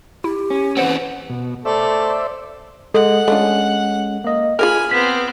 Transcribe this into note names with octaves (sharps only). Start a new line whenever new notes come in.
E4 G4
C#4
E3 C4 B4 C5 F#5
B2
A3 C5 D5 E5
G#3 A4 F#5
G#3 A3 C#4 D4 F4
A#3 D#5
F4 G#4 A#4 G#5 B5 F6
B3 C4 B6